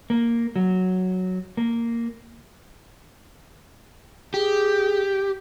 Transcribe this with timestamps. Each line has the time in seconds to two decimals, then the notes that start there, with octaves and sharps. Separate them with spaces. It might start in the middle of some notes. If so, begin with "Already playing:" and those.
0.10 A#3
0.56 F#3
1.57 A#3
4.34 G4 G#4